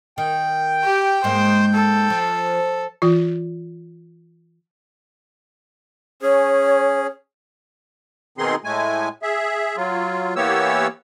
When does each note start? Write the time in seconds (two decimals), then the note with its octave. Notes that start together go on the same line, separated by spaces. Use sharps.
0.18 D#3 G5
0.84 G4
1.24 G#2 G#3 A#3 C5
1.74 A4
2.10 F3
3.02 E3 F4
6.22 C#4 G#4 C#5
8.38 B2 D#3 C4 D#4 G#4 C6
8.64 A2 G#3 A3 G#5
9.22 G#4 E5
9.77 F#3 F4
10.36 E3 A#3 B3 G4 C#5 E6